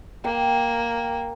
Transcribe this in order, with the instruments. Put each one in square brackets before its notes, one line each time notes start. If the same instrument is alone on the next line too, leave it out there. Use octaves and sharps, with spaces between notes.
[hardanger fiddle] A#3 [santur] G5